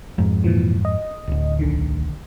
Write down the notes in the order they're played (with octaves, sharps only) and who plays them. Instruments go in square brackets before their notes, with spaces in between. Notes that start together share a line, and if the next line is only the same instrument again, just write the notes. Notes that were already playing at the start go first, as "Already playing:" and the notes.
[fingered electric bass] F2 G#2
[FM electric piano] A#2 E3 F3
D#5
[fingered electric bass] D1 D2
[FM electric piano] B1 D3 D#3